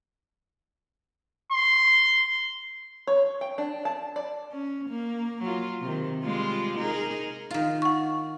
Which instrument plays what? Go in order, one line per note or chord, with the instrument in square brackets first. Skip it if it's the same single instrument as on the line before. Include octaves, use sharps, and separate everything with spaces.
[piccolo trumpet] C6
[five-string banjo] C#5
G5
D4
A5
D5
[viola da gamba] C#4
A#3
F#3 F4
C3 D#3
G3 G#3 F4
D#4 G#4 A#4
[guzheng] D#3 F4
[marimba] F#5 C#6